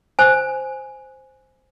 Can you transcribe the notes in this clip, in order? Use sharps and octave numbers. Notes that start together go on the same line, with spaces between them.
C5 G#5